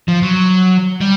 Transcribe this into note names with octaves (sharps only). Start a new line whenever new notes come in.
F3
F#3
G3